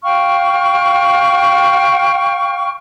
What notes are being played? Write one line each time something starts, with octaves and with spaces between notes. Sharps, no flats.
F5 G5 C#6 F6